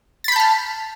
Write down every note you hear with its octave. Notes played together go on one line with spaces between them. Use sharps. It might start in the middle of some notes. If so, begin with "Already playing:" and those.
A5 B5 F6 G6 A6